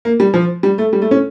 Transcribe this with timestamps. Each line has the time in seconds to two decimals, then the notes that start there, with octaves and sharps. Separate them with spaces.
0.05 A#3
0.20 G3
0.34 F3
0.63 G3
0.78 A3
0.93 G3
1.02 A3
1.11 C#4